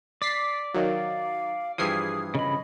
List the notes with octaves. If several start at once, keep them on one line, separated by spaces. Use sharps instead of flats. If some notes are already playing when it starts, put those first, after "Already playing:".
D5 A6 B6 C7
D#3 F#3 F5
G2 E3 F3 G#4 D#6 G#6 C7
C#3 D#5 B5